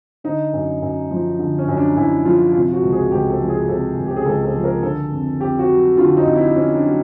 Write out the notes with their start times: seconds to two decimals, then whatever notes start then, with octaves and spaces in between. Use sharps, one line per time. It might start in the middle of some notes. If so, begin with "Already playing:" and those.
0.24 D3 D#4
0.53 F#2
0.82 F#2
1.11 F3
1.39 D3
1.58 C#4
1.68 F#2
1.77 D4
1.96 F#2 E4
2.25 F3 F4
2.53 C3 F4
2.73 F#4
2.82 C#2
2.92 G#4
3.11 C#2 G4
3.30 A4
3.39 F3
3.49 G#4
3.68 C3 A4
3.97 C#2
4.07 G4
4.16 G#4
4.26 C#2 A4
4.45 A4
4.55 F3
4.64 A#4
4.83 D3 A4
5.12 F2
5.40 F2 G4
5.59 F#4
5.69 F#3
5.97 D3 F4
6.17 D#4
6.26 F2
6.36 E4
6.55 F2 C#4
6.74 D4
6.84 F#3